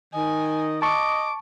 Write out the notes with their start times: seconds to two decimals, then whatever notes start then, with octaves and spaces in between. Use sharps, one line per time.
0.14 D#3 D#5 G#5
0.82 D#5 A5 C#6 D6